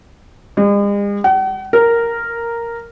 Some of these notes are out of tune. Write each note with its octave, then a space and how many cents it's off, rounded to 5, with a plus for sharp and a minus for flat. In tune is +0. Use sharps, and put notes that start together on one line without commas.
G#3 -45
F#5 +45
A#4 -5